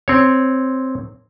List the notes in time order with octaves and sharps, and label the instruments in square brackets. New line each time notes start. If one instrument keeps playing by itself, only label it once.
[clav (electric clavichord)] C4 C#5